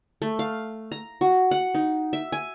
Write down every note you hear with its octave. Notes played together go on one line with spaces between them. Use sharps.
A3
F5
A#5
F#4
F#5
D#4
E5
G#5